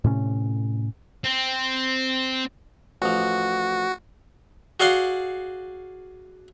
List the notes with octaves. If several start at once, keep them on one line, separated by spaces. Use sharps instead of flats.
A2 C3 C#4
C4
A1 F3 F#4
F#4 G#4 D5 F5 F#5 C6